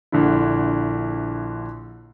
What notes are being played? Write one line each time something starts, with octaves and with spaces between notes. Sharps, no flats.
A#1 D3 E4